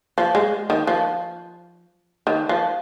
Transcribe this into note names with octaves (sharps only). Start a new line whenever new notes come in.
F3
G#3
D#3
F3
D#3
F3